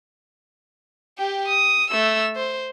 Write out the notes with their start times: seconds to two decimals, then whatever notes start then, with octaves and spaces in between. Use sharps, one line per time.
1.18 G4 G5
1.48 D#6
1.90 A3 E6
2.36 C5